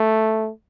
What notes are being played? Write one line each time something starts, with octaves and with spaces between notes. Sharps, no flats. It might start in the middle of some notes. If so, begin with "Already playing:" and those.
Already playing: A3